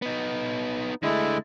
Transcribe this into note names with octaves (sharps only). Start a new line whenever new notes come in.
B3 D#4
D3 G#3 A3 E4